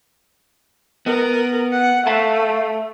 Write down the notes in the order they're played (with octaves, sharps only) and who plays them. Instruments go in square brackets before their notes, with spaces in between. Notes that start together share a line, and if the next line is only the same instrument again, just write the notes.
[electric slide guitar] B3 [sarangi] A#4
[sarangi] F#5
[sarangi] A3 [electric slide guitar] E5 F5 A5